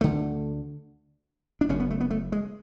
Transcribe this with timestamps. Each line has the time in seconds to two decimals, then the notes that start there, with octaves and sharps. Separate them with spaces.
0.01 D2 D3 A3
1.61 D4
1.69 F#1 F#2 C#3 C#4
1.80 B3
1.91 A3
2.01 B3
2.10 A3
2.32 G#3